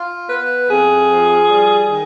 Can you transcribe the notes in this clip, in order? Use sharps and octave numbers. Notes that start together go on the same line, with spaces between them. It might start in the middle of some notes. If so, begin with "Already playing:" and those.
Already playing: F4
B3 B4
F2 G#4
F3
G3
D#3